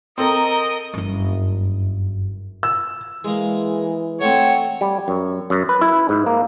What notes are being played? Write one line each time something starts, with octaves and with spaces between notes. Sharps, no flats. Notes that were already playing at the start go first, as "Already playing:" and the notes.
C4 A4 A#4 D#5 A#5 D#6
F#1 G2
E6
E3 G#3 A#3 G#4
A3 C4 C#5 F#5 G5
G3
F#2
F#2
B4
E4
G#2
A#3